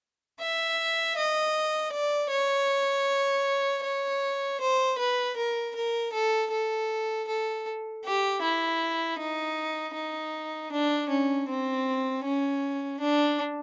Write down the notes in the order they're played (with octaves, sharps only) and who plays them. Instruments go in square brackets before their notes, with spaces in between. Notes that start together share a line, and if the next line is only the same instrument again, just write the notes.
[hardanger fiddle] E5
D#5
D5
C#5
C#5
C5
B4
A#4
A#4
A4
A4
A4
G4
E4
D#4
D#4
D4
C#4
C4
C#4
D4